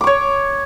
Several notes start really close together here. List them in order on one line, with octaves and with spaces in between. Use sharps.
D6 C#6 C#5